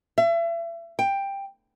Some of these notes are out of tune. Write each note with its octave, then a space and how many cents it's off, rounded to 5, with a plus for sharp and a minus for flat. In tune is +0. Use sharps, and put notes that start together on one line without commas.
E5 +35
G5 +10